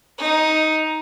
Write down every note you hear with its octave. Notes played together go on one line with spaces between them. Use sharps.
D#4